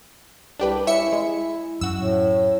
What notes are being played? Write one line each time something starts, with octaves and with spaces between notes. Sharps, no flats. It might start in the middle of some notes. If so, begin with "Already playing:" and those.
C2 D4 G4 B4
C#4 E4 E5 C#7
G#3
F#2 F#4 E6
A2